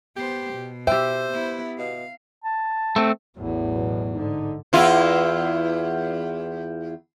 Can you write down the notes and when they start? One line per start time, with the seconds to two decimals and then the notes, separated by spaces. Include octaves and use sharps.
0.16 B3 G4 C5
0.53 B2
0.87 G4 C5 E5 G5
1.33 B3 E4
1.78 B2 F5
2.44 A5
2.96 A3 C4
3.37 A1 E2 A2 F#3
3.74 B2
4.12 G#2 D3 D#4
4.73 E2 E4 F4